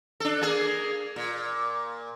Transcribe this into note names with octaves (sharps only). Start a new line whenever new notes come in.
D4 A4
A#3 G#4
A#2